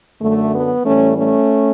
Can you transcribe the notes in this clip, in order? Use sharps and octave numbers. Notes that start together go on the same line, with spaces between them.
F#2 D3 F#3 A3
B3
A2 E3 G3 A3 C#4
A3 C#4